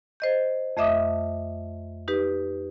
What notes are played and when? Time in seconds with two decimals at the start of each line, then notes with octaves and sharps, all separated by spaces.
0.20 C5 D#5 G6
0.77 F2 A3 D#5 E5 D6 D#6
2.08 D#4 G4 B4